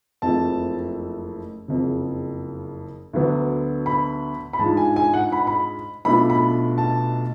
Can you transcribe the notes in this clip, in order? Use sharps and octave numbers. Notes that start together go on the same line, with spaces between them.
F#1 F2 F3 A3 A5
F#1 F2 C#3
D2 D3 F#3 B3 D4
B5
B5
G#2 G#3 D4 F4 A5
G#5
G#5
F#5
B5
B5
B1 B2 A3 D4 F4 B5
B5
A5